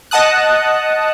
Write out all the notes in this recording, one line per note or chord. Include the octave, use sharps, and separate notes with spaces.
D#5 F#5 A5 D#6 F#6